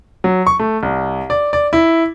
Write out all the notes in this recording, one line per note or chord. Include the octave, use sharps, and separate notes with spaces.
F#3
C#6
A3
C2
D5
D5
E4